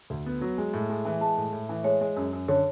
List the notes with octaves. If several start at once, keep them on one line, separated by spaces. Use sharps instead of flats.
D2
B3
F#3
G#3
A2
G#3
E3
G#3 A5
A2
A2
E3
G#3 C#5
G#3
F#2
F#2
D3 C#5